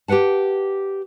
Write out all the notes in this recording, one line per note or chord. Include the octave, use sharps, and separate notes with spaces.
G4 G#4 B4 F#5 A5